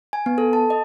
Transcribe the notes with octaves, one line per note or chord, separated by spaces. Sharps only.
G#5
B3
A4
A5
D#5